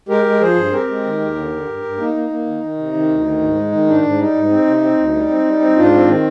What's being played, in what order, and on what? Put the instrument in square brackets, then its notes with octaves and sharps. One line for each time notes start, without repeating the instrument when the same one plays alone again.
[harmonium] G#3 G4 A#4
G#3
F3 G#4 C5
G2
C4 G4 A#4
G#3
D#3
D#2
D3
D3
G2
G2
A#3 D#4
A#3
A#3
D#3
D#3
C3
D#3
D2
D#3
G#2
G#3
D#3
G#2 D4
G#2
G3 D#4
G#2
C4
C3
C4
D2
G3
C4
G3
C4
G#2 D4 F4
C4
D#3